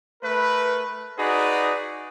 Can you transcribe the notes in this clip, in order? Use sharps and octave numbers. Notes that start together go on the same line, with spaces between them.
A3 A#4 B4
D#4 F#4 G#4 B4 D5